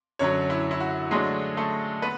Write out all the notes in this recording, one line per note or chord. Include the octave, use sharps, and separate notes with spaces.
F#2 D3 F#3 C#4 C#5
E4
E4
F#4
D3 F#3 G#3 A3 D4 G#4
A3 A4
B3 B4